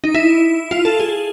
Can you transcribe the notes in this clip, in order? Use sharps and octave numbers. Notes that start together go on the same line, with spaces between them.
D#4
E4
F4
A4
G#4